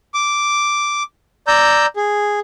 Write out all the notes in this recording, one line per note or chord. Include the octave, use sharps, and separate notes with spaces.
D6
D5 A#5 E6 G6
G#4